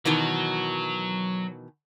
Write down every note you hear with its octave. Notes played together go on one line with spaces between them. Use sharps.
B2 D#3 E3 F#3